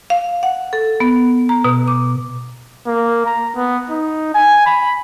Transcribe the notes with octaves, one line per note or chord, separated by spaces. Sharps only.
F5
F#5
A4
B3
A#5
B2
D6
A#3
A#5
B3
D#4
G#5
B5